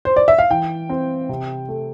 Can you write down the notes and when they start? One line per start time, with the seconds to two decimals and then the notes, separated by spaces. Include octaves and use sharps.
0.05 C5
0.16 D5
0.28 E5
0.39 F5
0.51 E3 G5
0.89 C4
1.29 C3
1.69 A3